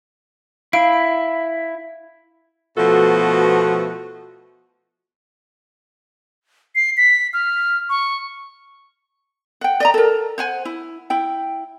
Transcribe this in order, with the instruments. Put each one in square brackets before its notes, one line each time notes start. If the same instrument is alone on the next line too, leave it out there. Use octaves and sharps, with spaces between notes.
[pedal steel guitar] E4 [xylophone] F5 D7
[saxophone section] B2 F3 A3 B3 F#4 A4
[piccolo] C7
B6
F6
C#6
[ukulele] F#5 G5
D5 D#5 A#5
A4 A#4
C5 F#5 G#5
E4
E4 G5